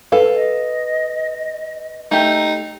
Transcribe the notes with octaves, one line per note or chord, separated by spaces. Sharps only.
A4 B4 F5
D#5
A3 D#4 G4